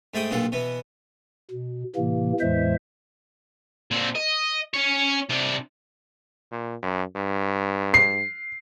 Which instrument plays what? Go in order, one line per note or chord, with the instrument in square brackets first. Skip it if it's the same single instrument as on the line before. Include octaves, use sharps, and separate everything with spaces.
[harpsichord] G#2 A3 G#4 G5 D#6
B1 G2 A#2 F4 A4 F#5
B2 E3 B3
[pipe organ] B2
A2 C3 E3 A#3
E2 A2 E3 G#3 C5 E5
[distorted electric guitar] A#2 C4
D#5
C#4 C#5
C3 D4
[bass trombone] A#2
F#2
G2
[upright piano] C7